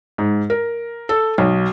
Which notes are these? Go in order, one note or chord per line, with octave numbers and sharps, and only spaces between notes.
G#2
A#4
A4
B1